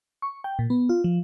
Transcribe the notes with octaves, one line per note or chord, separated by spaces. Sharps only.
C#6
G5
A#2
B3
F4
F3